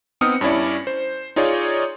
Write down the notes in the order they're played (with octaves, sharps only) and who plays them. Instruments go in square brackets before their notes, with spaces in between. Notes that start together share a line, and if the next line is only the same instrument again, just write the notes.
[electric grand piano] B3 C4 D#4 D#6 F6 C#7
G2 C#4 E4 D5
C5
D#4 F4 G#4 C#5 D5